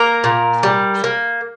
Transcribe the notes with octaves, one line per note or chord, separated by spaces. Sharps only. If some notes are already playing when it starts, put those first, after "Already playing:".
Already playing: A#3 A#4
A#2
G3
A#3